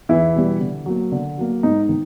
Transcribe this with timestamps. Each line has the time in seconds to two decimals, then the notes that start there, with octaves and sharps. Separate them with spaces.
0.09 E2 E3 E4
0.35 B2 G3
0.60 D3
0.86 F#3 A#3
1.12 D3
1.38 F#3 A#3
1.63 G#2 D#4
1.89 D#3